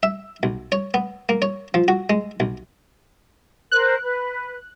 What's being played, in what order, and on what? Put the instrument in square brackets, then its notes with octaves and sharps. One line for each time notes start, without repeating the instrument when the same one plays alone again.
[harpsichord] E5
B1
C#5
B3
A#3
C#5
F3
F#4
G#3
B1
[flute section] A#4 C5 [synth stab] F#6
[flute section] B4